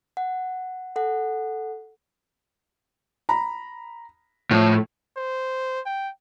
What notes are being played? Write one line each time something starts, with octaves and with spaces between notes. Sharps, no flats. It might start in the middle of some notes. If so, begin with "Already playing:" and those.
F#5
A4 F#5
A#5 B5
A2 F3
C5
G5